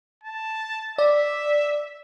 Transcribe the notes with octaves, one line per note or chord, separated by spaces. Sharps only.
A5
D5 E5